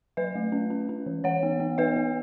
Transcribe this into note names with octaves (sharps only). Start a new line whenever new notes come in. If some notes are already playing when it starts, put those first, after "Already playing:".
F#3 B4 E5
A3
C#4
C#4
C#4
E3
E3 C#5 F#5
B3
B3
B3 B4 E5
B3